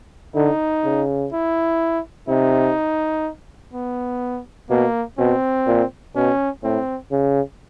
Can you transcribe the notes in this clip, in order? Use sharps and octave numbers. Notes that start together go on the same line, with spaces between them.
D3 D#4
C#3
E4
C3 D#4
B3
B2 A#3
B2 C4
A#2
B2 C#4
A2 C4
C#3